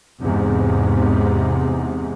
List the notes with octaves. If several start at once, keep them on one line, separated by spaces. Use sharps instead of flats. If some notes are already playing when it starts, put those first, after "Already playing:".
E2 G#2 C3